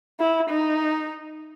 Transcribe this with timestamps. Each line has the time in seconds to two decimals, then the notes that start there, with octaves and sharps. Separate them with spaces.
0.20 E4
0.49 D#4